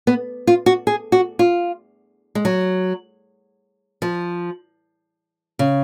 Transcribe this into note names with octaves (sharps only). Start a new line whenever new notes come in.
B3
F4
F#4
G#4
F#4
F4
G#3
F#3
F3
C#3